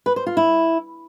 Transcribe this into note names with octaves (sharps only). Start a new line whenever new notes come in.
B4
C5
F4
E4